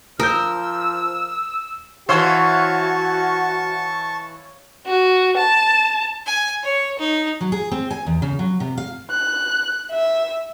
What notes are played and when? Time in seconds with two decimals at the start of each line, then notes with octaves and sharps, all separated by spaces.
0.19 F3 A#4 D#6 E6 G6
2.09 E3 F#4 C5 C#5 E5 F5 A5 C#6
4.86 F#4
5.37 A5
6.26 G#5
6.64 C#5
6.99 D#4
7.41 F#3
7.52 G#4
7.72 C4
7.91 G#5
8.06 E2
8.22 C#3
8.39 F#3
8.60 C3
8.78 F5
9.10 F#6
9.91 E5